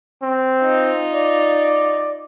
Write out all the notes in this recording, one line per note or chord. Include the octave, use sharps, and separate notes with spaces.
C4
D#4 F4
D5